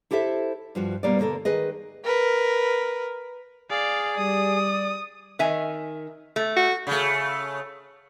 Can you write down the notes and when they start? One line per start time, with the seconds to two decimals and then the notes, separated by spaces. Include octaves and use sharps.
0.11 E4 G4 A4 C5 E5
0.75 G2 F3 F#4
1.03 B2 G3 A#3 B3 D5
1.18 B2 D3 A#3 A4 A#4
1.45 D#3 G#4 B4 D#5
2.04 A#4 B4
3.70 G#4 D5 F5
4.17 G3 D5 D#6
5.39 D#3 E5 G#5
6.36 A3
6.56 F#4
6.87 C#3 A3